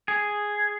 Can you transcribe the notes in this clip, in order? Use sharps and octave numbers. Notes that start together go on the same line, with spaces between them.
G#4